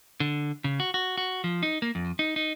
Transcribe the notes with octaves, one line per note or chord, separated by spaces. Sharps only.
D3
C#3
F#4
F#4
F#4
F3
D#4
A#3
F2
D#4
D#4